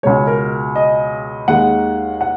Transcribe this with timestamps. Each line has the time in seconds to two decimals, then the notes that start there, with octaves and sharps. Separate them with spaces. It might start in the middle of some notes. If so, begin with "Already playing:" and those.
0.03 C#2 B2 G#3 C#5
0.27 A#4
0.76 D#5
1.48 D#2 D#3 G#3 F#5
2.21 F#5